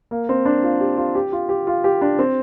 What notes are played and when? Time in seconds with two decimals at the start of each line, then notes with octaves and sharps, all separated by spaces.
0.11 A#3
0.29 C4
0.46 D4
0.63 F4
0.80 G4
0.97 F4
1.15 G4
1.32 F4
1.49 G4
1.67 F4
1.84 G4
2.02 D4
2.19 C4